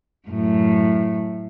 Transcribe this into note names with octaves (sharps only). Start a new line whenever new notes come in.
F#2 A2